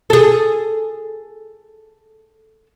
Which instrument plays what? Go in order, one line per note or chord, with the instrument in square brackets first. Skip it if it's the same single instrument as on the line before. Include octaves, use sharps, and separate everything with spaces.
[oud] G#4 A4